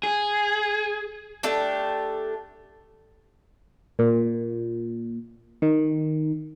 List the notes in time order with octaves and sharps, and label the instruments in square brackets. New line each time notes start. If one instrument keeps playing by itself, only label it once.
[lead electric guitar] G#4
[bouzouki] A3 D4 G4
[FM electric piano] A#2
D#3